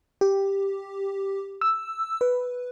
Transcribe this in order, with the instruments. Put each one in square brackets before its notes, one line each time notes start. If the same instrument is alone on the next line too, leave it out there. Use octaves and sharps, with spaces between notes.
[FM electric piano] G4
E6
B4